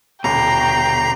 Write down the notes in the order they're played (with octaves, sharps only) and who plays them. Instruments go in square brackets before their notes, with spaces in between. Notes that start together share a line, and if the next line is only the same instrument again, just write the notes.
[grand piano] D#1 [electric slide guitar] B2 D3 [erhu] G5 [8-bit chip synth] A#5 A#6 C7